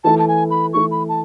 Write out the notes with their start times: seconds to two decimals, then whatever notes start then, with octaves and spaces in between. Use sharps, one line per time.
0.04 E3 A3 E4 A4 A5
0.19 A5
0.28 G#5
0.50 B5
0.73 E3 A3 E4 A4 C#6
0.91 B5
1.09 A5